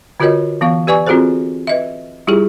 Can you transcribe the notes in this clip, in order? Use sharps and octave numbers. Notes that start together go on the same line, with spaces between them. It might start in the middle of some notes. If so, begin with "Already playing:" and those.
D3 F4 F#4 A#4 C#5 D#5
E3 B3 F5 C#6
G4 B4 D5 G#5 C#6
C4 F4 F#4 G#4 A4 C5
B4 D#5 E5
G3 E4 F4 G4 G#4